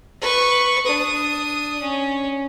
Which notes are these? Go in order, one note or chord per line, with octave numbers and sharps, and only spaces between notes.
B4 C#6
D4 D#6
C#4